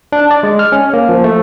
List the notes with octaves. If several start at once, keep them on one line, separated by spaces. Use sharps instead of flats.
D4
D5
G#3
F6
C#4
A#3
F3
A3